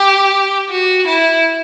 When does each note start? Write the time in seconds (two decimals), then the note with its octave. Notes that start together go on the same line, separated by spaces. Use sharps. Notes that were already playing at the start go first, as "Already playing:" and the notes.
Already playing: G4
0.70 F#4
1.07 E4